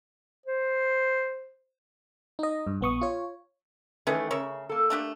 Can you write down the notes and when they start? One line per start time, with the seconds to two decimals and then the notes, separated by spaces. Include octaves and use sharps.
0.46 C5
2.39 D#4 D#5
2.67 G2
2.81 A#1 B3 C#6 D#6
3.01 F4 C#5
4.07 D#3 E3 A3 C#4 G#4 B4
4.30 C#3 A#4 C#5 E5
4.69 A#3 A4
4.90 A3 D4 G4